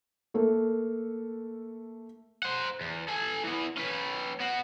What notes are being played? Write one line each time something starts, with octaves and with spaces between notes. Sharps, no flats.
A3 A#3 A4
C5 F#5
E2
A4 G#5
E3 B3
C#4 B4
B3 F#4